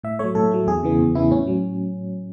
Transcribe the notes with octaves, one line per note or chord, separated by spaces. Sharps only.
A2 E5
F#3 A3 C#5
A2 A4
F#3 A3
E2 G#4
C#3 E3 B3
E2
C#3 E3 B3 E4
A2 C#4
F#3